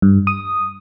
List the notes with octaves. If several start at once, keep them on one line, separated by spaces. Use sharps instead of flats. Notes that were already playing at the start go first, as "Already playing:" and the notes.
G2
D#6